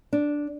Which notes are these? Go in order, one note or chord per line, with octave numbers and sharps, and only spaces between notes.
D4